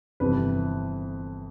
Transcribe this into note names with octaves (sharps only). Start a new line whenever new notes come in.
G1 F2 C3 E3 B4